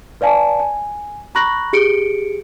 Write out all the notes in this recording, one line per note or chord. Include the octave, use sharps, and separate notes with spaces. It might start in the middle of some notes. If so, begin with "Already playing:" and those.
B4 D5 F5 G#5 A5
G#5
A#5 B5 C#6 F#6 A#6 F#7
G4 G#4 C#7 D7